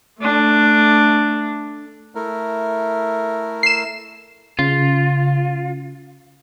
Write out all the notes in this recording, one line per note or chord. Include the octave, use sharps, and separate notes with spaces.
A3 D4
A3 E4 A#4
C7 E7
C#3 F4